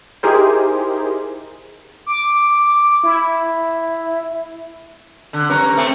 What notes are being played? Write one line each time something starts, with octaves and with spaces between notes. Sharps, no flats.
D#4 E4 G4 G#4 A#4 C5
D6
E4
D3
G2 C#4 A#4
A3 C4 C#4